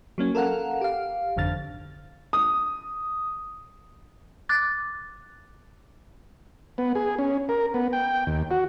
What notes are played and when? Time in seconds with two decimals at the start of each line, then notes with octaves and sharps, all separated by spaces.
0.18 F#3 A#3 C#4
0.35 A4 A#4 F5 F#5
0.81 G4 F5
1.36 G#1 F2 D3 F6 A6
2.33 D#6
4.49 D6 F#6 A6
6.78 B3
6.95 G#4
7.19 C#4
7.49 A#4
7.74 B3
7.93 G5
8.27 D#2
8.51 F#4